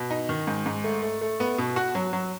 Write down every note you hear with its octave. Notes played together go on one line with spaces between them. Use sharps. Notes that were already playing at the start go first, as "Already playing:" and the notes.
Already playing: B2
D#4
D#3
G#2
G#2
A3
A3
A3
B3
B2
F#4
F#3
F#3